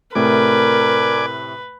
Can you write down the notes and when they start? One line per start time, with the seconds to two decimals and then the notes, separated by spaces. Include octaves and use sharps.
0.15 A2 C3 A3 A#4 B4 D5 G#5 D6